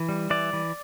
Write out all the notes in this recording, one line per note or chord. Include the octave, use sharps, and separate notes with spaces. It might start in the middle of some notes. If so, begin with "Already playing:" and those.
Already playing: E3
G3
E3 D5
E3